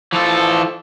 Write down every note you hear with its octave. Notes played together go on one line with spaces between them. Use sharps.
E3 F3 A4